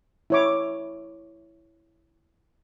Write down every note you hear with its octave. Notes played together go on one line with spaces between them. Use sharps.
E4 C#5 D6